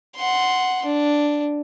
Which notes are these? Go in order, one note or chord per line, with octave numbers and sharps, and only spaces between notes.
F#5 C6
D4